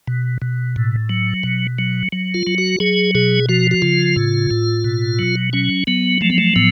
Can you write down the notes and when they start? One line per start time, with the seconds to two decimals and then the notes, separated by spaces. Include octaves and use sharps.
0.07 B2
0.42 B2
0.76 A2
1.09 F#3
1.43 B2
1.79 F#3
2.12 F#3
2.34 F4
2.47 F#3
2.58 F#4
2.80 F#3 G#4
3.15 B2 G#4
3.49 F3 F#4
3.71 F#4
3.82 C#3 F4
4.16 A2
4.51 A2
4.84 B2
5.19 F#3
5.53 F#3 C#4
5.87 F#3 B3
6.21 F3 A3
6.30 B3
6.38 A3
6.56 A2 B3